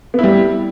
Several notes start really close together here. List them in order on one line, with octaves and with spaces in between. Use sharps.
B3 E4 G3